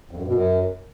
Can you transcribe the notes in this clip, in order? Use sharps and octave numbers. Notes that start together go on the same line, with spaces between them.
F2
F#2
G2
B2
F#2